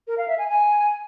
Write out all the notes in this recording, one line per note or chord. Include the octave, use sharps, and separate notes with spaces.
A#4
F5
E5
G#5
G#5